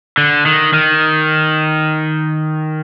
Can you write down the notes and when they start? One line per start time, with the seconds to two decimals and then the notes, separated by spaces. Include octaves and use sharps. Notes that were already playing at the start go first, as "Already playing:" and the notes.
0.18 D3
0.46 D#3
0.74 D#3